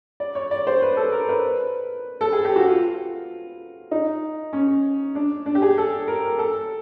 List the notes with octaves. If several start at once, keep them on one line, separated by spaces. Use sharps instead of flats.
D5
C#5
D5
C5
B4
A4
A#4
B4
A4
G#4
G4
F#4
F4
D#4
C#4
D4
D4
G4
G#4
A4
A#4
A4